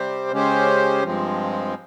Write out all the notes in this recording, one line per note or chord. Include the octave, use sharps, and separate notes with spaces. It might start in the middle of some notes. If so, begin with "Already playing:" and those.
Already playing: C3 G3 C4 G4 C5
C#3 G#3 C#4 G4 C5
G2 F3 G#3 C4